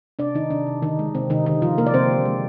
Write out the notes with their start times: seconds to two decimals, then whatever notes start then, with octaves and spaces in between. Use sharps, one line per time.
0.19 C3 D4 D5
0.35 C3 D#3 D#4
0.50 C3 D4
0.67 C3
0.82 D3 D#3 D#4
0.99 G#3
1.15 C3 C4
1.30 C3 D#3 D#4
1.46 D3 D#3 D#4
1.62 D3 F3 F4
1.78 C3 A#3 A#4
1.87 D5
1.94 C3 C4 C5
2.10 D3
2.25 G#3